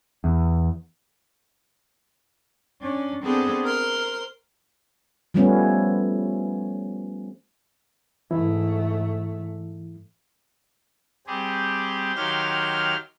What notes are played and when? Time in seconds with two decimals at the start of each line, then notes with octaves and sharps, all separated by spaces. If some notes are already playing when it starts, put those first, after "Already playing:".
0.24 E2
2.82 C#4 D4
3.24 B3 C4 D4 G#4 A4 C5
3.64 A#4 C5 C6
5.34 F3 G3 A3 B3 C#4
8.31 G#2 E3 A3 E4
11.27 G3 C4 G4 G#4
12.15 D#3 F#3 G4 F5 C6 F6